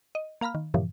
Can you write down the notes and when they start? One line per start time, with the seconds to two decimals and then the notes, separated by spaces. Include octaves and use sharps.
0.15 D#5
0.41 A#3 F5 A#5 B5 F6
0.55 D#3
0.74 G2 A#2 C#3 E3 F3